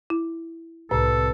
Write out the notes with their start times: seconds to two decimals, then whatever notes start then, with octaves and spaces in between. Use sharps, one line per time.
0.10 E4
0.91 C2 A2 A4 B4